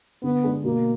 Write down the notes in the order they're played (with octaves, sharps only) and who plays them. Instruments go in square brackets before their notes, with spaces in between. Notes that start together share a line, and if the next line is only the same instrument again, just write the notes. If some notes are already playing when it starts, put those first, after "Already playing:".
[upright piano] D3 [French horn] B3
[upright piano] G#3 D4 G#4
[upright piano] B2 [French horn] A#3